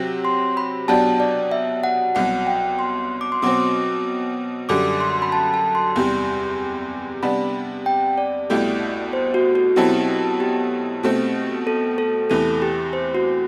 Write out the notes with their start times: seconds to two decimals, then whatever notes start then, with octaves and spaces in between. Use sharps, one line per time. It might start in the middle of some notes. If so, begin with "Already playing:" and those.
Already playing: C3 F#3 C4
0.25 C6
0.57 B5
0.88 B2 F#3 B3 D4 G4 A5
1.20 D5
1.52 E5
1.84 F#5
2.15 C2 B2 F#3 F#5
2.47 G5
2.79 C6
3.21 D6
3.32 C6
3.42 B2 F#3 C4 D6
4.69 F#2 D3 G3 D6
5.00 C6
5.22 B5
5.32 A5
5.54 A5
5.75 C6
5.96 E2 C3 G3
7.22 C3 G3 B3 D4 B5
7.86 G5
8.18 D5
8.50 C2 B2 A3 E4 G4
9.13 C5
9.34 F#4
9.55 F#4
9.76 B2 F#3 C4 E4 G4 A4
10.40 G4
11.03 B2 A3 C4
11.67 A4
11.98 A4
12.30 E2 C3 E3 A3 A4
12.62 G4
12.93 C5
13.15 F#4